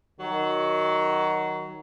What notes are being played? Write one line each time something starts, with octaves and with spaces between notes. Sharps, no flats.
D#3 F#3